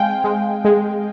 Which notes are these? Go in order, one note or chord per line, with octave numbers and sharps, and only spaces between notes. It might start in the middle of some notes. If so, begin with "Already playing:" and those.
Already playing: G#3 C4 F5 G5 G#5
G#3
G#3